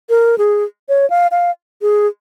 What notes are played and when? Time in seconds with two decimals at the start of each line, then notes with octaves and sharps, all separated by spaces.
0.10 A#4
0.38 G#4
0.89 C#5
1.10 F5
1.31 F5
1.82 G#4